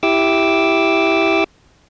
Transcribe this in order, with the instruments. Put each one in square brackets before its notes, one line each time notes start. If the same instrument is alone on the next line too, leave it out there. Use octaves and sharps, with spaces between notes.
[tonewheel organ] E4 G4 D6 E6